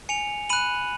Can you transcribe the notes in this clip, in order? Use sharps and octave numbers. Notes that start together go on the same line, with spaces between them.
G#5 C#7 F7
B5 F#6 D#7 F#7